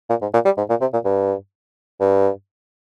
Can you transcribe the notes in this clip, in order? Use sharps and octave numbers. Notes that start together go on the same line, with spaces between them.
A#2
G#2
A#2
G3
G#2
A#2
C3
A#2
G2
G2